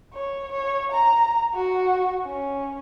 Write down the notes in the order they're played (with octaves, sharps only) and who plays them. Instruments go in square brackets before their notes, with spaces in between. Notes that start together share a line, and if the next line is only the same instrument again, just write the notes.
[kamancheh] C#5
C#5
A#5
F#4
C#4